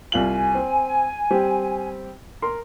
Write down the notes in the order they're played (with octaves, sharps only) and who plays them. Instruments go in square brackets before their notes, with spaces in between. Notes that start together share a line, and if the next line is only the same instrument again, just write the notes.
[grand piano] C2 F4 F#7 [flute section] G#5
[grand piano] C4
G3 C4 G4
A#4 C6